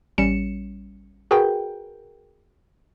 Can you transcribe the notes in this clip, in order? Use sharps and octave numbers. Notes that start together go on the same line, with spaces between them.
A1 G3 C#4 C#7 E7
F#4 G#4 A#4 B4 G5